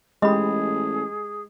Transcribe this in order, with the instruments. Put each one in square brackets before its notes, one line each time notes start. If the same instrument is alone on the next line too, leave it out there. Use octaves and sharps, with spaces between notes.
[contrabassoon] A1 [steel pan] G#3 G4 [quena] G#4 [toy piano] D#5 B5